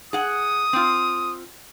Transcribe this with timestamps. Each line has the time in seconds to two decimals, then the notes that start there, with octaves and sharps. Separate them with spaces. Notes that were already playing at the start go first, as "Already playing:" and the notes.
0.13 G#4 F#5 D#6
0.73 C4 F4